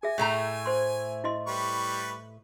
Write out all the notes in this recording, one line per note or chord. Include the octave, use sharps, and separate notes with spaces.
G#4 E5 G#5
A2 A3 A#5
C5 C6
E4 D#5 C6
G3 B4 C#6